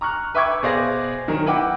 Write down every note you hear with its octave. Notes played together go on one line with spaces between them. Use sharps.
A#5 C#6 F6 F#6
B4 E5 G5 C#6 D6 G#6
B2 G#4 C5 D5 F5 A#6
D#3 F#3 A#4
E4 B4 F#5 G5 D6